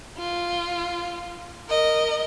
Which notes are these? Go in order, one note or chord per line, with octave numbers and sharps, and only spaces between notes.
F4
A#4 D#5